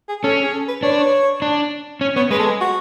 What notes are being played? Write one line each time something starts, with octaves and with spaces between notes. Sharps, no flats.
G#4
C#4 A4
G#4
A4
B4
D4 C#5
B4
C#5
D4
C#4
B3 C#5
G#3 B4
A4
G#4
F#4